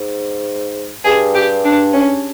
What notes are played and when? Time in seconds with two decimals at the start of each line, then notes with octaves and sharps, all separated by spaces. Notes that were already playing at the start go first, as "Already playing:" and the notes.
Already playing: G#2
1.04 G2 G#4
1.35 G4
1.65 D4
1.93 C#4